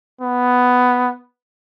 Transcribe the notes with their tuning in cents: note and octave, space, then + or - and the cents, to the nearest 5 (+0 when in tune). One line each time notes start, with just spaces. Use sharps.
B3 +5